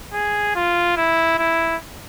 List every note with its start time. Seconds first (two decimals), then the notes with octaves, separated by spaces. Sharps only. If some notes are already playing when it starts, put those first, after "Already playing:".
0.13 G#4
0.55 F4
0.97 E4
1.38 E4